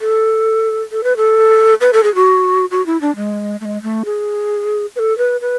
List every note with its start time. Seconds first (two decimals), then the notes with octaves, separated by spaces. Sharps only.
0.01 A4
0.92 A4
1.04 B4
1.17 A4
1.81 B4
1.93 A4
2.03 G#4
2.15 F#4
2.71 F#4
2.86 E4
3.01 D4
3.16 G#3
3.61 A3
3.65 G#3
3.83 A3
4.05 G#4
4.96 B4
4.99 A4
5.18 B4
5.41 B4